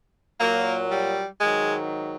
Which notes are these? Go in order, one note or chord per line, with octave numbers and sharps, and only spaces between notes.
A#2 F#3 A#3
G3
G#2 D#3 F#3 G#3